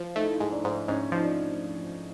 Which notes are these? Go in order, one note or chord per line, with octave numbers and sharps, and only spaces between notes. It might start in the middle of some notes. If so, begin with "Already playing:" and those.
Already playing: F3
A3 D#4
E4
D#4
G#2
D4
G#2
G#2 C#4
F3 D#4
D4